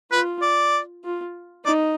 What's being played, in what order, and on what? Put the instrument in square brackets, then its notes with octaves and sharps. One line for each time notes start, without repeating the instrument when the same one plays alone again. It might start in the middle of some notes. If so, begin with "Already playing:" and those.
[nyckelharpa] F4 [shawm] B4
[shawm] D5
[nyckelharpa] F4
[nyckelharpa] D#4 [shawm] D5